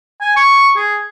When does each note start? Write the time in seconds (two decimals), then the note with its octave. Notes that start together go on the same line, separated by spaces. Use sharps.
0.21 G#5
0.36 C#6
0.76 G#4